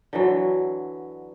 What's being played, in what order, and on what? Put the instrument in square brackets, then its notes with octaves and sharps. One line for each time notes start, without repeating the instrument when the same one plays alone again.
[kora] D3 E3 F#3